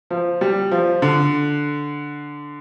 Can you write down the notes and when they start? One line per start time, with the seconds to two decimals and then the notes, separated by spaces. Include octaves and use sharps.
0.10 F3
0.41 G3
0.71 F3
1.02 D3